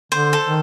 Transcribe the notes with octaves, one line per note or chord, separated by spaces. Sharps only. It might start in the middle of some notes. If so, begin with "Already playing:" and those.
D3 C5
A4
D#3